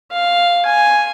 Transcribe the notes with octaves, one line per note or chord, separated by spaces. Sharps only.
F5
G#5